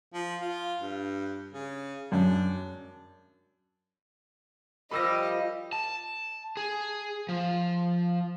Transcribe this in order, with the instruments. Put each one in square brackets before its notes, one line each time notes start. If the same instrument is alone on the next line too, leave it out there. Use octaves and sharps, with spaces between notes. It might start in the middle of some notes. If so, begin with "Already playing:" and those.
[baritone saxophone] F3
F4
G2
C#3
[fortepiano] F#2 [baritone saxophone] D4
[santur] F3 A#4 [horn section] G3 [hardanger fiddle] D#5 [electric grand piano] B5 E6 A#6
[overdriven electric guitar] A5
G#4
F3